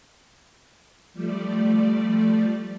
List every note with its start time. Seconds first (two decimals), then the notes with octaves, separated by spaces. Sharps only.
1.14 F3 G3 A3 D5